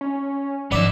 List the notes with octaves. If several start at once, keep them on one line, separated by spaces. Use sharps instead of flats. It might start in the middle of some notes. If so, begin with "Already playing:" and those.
C#4
G#2 F3 B3 D#4 D5 E5 D6